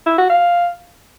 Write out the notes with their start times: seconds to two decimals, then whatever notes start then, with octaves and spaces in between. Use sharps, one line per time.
0.06 E4
0.18 F#4
0.30 F5